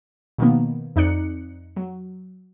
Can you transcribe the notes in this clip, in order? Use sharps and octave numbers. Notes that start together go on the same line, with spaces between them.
B2 D#3 F3 A#3 B3
F2 D#4 D5 F#6 C#7
F#3